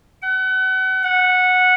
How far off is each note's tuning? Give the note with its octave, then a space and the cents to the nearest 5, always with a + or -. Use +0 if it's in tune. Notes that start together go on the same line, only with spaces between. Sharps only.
F#5 +35
F#5 -10